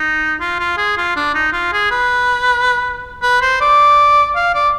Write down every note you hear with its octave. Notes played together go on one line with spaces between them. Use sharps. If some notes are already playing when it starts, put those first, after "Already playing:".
Already playing: D#4
F4
F4
G#4
F4
D4
D#4
F4
G#4
B4
B4
C5
D5
F5
D5